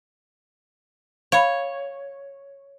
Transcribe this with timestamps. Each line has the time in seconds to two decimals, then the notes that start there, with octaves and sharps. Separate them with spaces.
1.32 C#5 F5 B5